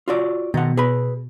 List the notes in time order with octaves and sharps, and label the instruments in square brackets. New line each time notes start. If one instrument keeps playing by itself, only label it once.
[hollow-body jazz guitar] F4 F#4 D5
[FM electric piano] B2 [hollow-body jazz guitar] D#3 F#5
[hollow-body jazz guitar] G#4 B4 B5